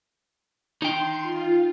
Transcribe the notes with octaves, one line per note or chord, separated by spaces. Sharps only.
D#4 G5 C6
F4